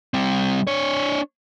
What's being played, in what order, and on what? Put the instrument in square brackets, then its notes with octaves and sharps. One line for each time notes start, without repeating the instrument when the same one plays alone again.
[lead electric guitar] G3 C4
D4 C#5